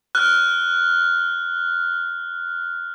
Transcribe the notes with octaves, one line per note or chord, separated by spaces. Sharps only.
F6 F#6